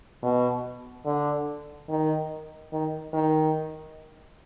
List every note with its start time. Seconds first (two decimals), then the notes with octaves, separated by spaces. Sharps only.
0.23 B2
1.05 D3
1.89 D#3
2.73 D#3
3.13 D#3